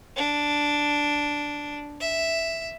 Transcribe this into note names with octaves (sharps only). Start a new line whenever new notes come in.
D4
E5